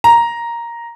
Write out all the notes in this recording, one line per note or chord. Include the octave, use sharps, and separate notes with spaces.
A#5